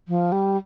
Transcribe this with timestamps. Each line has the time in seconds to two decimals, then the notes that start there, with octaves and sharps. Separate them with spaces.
0.08 F3
0.32 G3